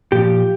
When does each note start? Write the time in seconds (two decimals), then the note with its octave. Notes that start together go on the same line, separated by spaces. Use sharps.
0.12 A#2 F3 G4